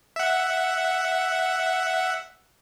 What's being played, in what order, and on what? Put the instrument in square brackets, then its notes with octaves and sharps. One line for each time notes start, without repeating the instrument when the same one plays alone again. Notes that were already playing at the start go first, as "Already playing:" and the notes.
[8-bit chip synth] E5 F#5